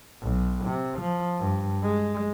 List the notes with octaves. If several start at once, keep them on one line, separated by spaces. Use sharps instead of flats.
B1
C3
F3
G2
G#3